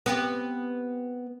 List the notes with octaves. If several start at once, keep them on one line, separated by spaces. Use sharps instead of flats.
B3 C4 G4